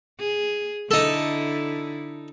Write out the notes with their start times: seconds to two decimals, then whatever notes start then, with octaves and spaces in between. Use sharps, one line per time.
0.20 G#4
0.91 D3 D#4 E4 A4